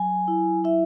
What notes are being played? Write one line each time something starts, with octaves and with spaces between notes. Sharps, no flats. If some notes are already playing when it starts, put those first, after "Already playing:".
Already playing: F#3 G#5
E4
E4 E5